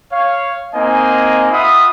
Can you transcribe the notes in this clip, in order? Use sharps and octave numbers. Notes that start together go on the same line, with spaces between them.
C#5 F5
A#3 C4 D#4 D#5 G#5
F4 E5 F#5 B5 D#6